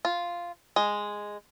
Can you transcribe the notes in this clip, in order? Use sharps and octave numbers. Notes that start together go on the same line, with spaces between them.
F4
G#3